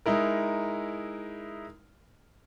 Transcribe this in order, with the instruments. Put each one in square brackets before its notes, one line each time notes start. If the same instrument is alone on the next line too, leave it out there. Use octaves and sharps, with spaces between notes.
[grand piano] G#3 D#4 E4 A#4